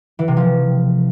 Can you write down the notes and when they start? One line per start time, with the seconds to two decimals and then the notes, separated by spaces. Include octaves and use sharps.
0.19 E3
0.28 C3
0.37 F3